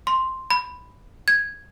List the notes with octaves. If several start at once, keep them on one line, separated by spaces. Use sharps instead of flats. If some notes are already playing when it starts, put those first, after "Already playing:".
C6
B5
G#6